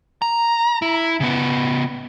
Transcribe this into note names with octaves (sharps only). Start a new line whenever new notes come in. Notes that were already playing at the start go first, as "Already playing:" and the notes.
A#5
E4
C#3 B3